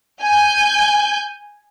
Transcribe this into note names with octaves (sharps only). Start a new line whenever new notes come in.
G#5 G6